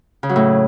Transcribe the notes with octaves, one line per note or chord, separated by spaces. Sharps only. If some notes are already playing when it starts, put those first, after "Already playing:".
C#3
F#3
A2